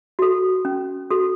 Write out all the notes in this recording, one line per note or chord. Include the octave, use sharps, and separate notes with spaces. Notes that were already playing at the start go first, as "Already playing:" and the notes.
F#4 A4
C#4
F#4 A4